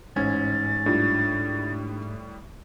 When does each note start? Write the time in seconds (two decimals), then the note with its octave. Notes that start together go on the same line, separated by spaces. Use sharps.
0.16 A1 G#2 C#4 G#6 A6
0.86 A2 G3 D4 F4